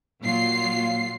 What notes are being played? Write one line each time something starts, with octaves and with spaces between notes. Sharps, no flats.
A#2 F#3 F4 C7